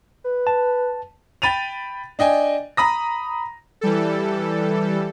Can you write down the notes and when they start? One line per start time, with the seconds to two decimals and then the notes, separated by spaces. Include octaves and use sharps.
0.24 B4
0.47 A5
1.42 G5 B5 A6 D#7 F7
2.19 D4 D#5 G5 G#5
2.77 A#5 B5 D#6 A#6
3.81 E3 G3 A4